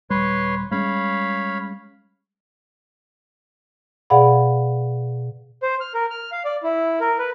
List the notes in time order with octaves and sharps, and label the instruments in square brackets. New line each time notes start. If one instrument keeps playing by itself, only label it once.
[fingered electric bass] D#1 G3 [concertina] B4 C#5 C6
[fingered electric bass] G3 G#3 C#4 [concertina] C#5 F5 B5
[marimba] B2 G#4 D5 F5 F#5 B5
[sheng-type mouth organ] C5
F6
A#4
F6
F5
D5
E4
A#4
B4